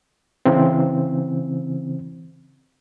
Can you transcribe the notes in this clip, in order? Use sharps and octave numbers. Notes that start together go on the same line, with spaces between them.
C#3 E3 C4